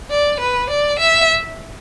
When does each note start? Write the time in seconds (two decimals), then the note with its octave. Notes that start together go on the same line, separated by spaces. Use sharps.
0.10 D5
0.40 B4
0.70 D5
0.99 E5